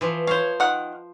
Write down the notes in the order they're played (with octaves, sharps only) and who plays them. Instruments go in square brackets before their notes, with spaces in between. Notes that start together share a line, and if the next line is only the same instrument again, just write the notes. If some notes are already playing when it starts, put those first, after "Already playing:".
[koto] E3 F3
[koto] C5 F5 [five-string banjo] C#5
[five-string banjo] D#3 F#5